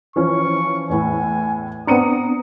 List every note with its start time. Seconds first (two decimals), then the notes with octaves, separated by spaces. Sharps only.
0.16 E3 F3 C#4 C#6
0.89 E2 A2 G#5
1.87 B3 C4 D4 A#5 D#6 C#7 D#7